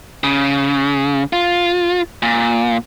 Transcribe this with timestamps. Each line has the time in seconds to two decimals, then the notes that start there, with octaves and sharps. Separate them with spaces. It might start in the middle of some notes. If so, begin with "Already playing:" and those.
0.24 C#3
1.33 F4
2.22 A#2